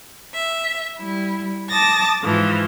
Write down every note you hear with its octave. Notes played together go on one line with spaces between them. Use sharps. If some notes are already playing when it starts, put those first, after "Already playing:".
E5
G3 E4
A5 D6 D#6 A6 A#6
G#2 E3 F3